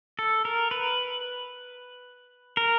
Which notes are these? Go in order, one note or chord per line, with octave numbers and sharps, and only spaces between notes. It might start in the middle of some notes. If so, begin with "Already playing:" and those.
A4
A#4
B4
A#4